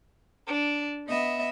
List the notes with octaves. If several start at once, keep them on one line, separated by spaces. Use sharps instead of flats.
D4
B3 D#5 E5